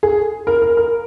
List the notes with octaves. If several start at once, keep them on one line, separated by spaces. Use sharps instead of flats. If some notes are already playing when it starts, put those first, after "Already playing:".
G#4
A#4
A#4
A#4